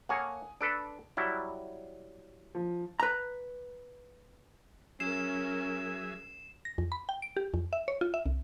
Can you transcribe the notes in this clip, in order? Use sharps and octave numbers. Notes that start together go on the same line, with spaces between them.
A#3 A4 C#5 F#5 G#5 D#6
D4 A4 B4 D7
F#3 G3 E4
F3
B4 A#5
F#3 C#4 G#4 A#4 E5 C7 E7
A#6
F2
B5
G5
D7
G4
F2
E5
C#5
F4
E5
C2